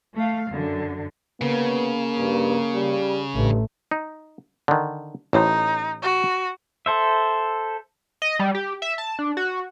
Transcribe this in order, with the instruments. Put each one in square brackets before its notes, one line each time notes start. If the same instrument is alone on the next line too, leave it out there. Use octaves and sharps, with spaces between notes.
[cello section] A3 F5
F#2 D3
[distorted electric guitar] C#3 [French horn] A#3 [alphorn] B3
[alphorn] G2
G3
[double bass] A1 [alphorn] G2 [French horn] A3
[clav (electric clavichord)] D#4
D3 D#3
[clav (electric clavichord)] A1 A2 C5 [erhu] D#4
[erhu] F#4
[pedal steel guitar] A4 C5 E5
[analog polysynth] D#5
G3
G4
E5
A5
D4
F#4